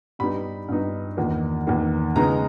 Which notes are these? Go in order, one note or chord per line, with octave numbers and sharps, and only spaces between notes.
G2 G3 B3 D#4 B5
G2 G3 B3 D#4
E2 D#3 A#3
E2 D#3 A#3
C#3 G#3 B3 D#4 A#5